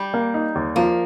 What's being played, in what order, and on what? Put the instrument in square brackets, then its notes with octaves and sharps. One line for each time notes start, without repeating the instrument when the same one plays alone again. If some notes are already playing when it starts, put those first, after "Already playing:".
Already playing: [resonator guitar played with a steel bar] G3
[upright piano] A#3
D#4
D#2
[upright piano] F3 [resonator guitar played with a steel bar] A#3